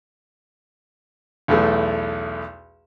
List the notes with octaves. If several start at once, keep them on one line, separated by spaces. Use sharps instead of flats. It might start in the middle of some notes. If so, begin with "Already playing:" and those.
B1 E2 A3